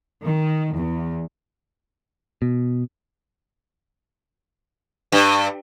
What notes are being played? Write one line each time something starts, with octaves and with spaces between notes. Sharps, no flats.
D#3
E2
B2
G2